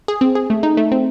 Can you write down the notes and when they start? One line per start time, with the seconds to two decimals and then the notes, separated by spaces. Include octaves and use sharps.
0.08 G#4
0.21 C4
0.35 G#4
0.50 A3
0.63 D#4
0.77 A3
0.92 C4